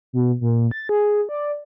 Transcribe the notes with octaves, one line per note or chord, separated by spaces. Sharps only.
B2
A#2
A6
G#4
D5